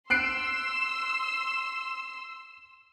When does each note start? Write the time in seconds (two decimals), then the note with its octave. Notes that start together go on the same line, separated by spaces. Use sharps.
0.10 C6 E6 F#6 C7 D7